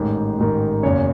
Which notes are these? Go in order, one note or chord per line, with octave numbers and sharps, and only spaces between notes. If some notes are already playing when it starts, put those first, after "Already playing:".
Already playing: A1 G#2 D#3
A1 G#2 D#3
F#1 E2 C#3 C#5